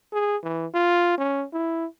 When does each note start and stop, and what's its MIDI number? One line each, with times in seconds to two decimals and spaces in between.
0.13 0.36 68
0.43 0.67 52
0.74 1.14 65
1.18 1.45 61
1.53 1.86 64